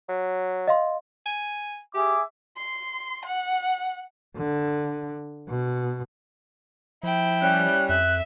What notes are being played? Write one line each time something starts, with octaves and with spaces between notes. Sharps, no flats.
F#3
D#5 F5 C6
G#5
G4 G#4 E5 D6
C6
F#5
D3
B2
F3 E4 G5
G3 C#4 F#6
F2 E5 F#6